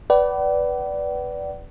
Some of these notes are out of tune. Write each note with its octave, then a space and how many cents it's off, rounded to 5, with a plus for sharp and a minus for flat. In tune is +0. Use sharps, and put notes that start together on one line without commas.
B4 +0 D5 -10 F#5 +45